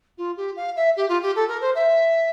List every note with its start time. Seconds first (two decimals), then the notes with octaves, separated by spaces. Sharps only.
0.17 F4
0.37 G4
0.56 F5
0.76 E5
0.96 G4
1.09 F4
1.22 G4
1.35 A4
1.48 A#4
1.61 C5
1.75 E5